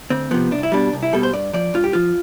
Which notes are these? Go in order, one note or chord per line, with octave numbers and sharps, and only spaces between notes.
D2 C4
C3 F3 B3
C2 D4
E4
B2 G3 D4
C2
E4
B2 G3 A4
C5
G2 D5
F3 D5
G2 F4
G4
F3 F4